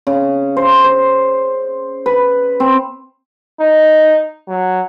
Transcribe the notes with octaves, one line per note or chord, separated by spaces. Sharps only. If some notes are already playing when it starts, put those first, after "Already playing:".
C#3
C5
C5
B4
C4
D#4
F#3